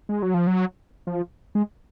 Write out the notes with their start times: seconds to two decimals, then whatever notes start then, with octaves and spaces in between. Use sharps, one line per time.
0.09 G#3
0.22 F#3
0.34 F3
0.47 F#3
1.07 F3
1.55 G#3